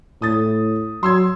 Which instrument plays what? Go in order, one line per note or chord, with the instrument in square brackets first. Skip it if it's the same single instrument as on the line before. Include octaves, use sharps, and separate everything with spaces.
[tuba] A2 [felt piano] D#6 A6
[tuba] F#3 [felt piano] C6 E6 G#6